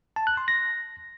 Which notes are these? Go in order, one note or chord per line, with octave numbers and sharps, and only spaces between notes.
A5
F#6
C6
A#6